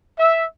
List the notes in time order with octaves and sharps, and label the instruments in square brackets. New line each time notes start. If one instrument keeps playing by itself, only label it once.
[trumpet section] E5